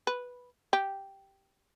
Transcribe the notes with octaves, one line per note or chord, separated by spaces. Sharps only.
B4
G4